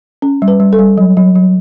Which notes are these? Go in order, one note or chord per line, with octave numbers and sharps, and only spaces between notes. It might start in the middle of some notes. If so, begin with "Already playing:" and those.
C#4
G3
B4
G3
A4
G3
F#3
F#3
F#3